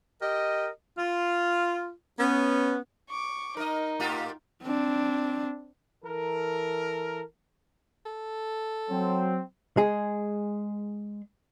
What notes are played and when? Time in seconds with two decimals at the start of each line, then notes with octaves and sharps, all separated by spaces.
0.22 G4 A#4 D#5
0.98 F4
2.20 B3 C#4
3.09 C#6 D6
3.57 D#4 A#4 D#5
4.00 A2 F4 G4
4.62 C4 D4
6.04 E3 A4 A#4
8.06 A4
8.90 F#3 C4
9.77 G#3 G#4